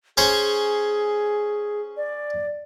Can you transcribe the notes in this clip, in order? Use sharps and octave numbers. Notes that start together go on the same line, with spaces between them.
C#4 G#4 C5 C#5
D5